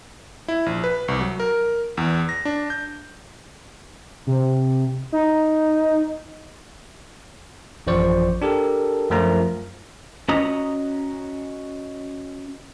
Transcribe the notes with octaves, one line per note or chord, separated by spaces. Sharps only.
E4
A#1
B4
C2
F#3
A#4
E2
A#6
D4
G6
C3
D#4
A1 F#2 F3 C5 D5 C#6
D4 G4 A4 A#4
F#2 F3 A3 F4 A#4 A#5
C#4 F#4 D#5 A#5 D#6